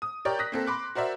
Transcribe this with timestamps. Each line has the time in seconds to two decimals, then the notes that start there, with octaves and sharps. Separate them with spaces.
0.02 D#6
0.25 G4 A#4 C#5 D5 G5
0.39 D#6 F#6 A#6 B6
0.52 A#3 C4 A4
0.67 B5 C6 D6 F#6
0.95 F#4 A#4 C5 D5 E5